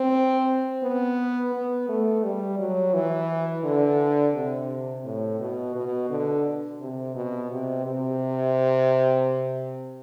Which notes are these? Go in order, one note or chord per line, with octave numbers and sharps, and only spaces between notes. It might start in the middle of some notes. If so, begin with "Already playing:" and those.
Already playing: C4
B3
B3
A3
G3
F#3
E3
D3
C3
A2
B2
B2
D3
C3
B2
C3
C3